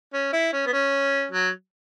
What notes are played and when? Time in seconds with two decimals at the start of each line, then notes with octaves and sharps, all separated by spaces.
0.14 C#4
0.33 E4
0.53 C#4
0.66 B3
0.73 C#4
1.31 F#3